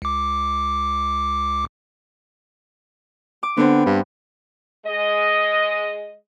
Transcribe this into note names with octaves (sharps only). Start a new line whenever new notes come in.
C#2 D6
D6
D3 B3 C4
G2
G#3 D#5